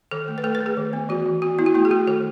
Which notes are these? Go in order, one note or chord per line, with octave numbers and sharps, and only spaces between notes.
D#3 A4
A3
B4
A3 A4
B4
A3
G#4
D#3
B3
E3 F#4
E3
B3 F#4
B3 E4
F#4
A3 E4
G#4
A3 F#4
D#3 A4